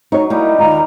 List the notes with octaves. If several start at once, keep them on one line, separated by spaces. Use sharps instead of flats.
F#3 D#4 C#5
G3 A#3 D#4 E4
D#2 A#3 F4 A#5